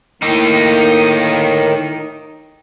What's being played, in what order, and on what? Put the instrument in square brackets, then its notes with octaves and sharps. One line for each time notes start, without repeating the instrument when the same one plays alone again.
[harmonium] A2 D#3 A#3 [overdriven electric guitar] D#4 G4